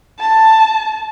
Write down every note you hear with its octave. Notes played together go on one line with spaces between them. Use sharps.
A5